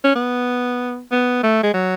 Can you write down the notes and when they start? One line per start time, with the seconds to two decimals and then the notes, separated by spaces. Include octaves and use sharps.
0.04 C#4
0.15 B3
1.11 B3
1.43 A3
1.63 G#3
1.73 F#3